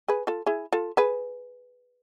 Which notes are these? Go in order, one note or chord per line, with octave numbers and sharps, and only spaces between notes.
G#4 B4
F4 A4
E4 G#4
F4 A4
G#4 B4